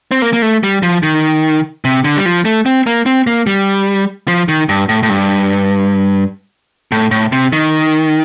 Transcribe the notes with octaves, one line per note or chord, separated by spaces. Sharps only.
C4
A#3
A#3
A3
G3
F3
D#3
C3
D3
G3
F3
A3
C4
A#3
C4
A#3
G3
F3
D#3
G2
A2
A2
G2
A2
A2
C3
D#3